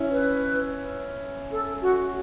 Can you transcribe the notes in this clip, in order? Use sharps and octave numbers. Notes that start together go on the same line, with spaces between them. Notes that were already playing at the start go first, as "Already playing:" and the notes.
Already playing: C#4 E4
B4
A4
F#4